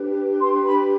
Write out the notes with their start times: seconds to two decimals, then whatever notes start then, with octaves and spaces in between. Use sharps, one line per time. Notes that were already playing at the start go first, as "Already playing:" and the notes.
Already playing: D4 G4 B4
0.41 C6
0.65 B5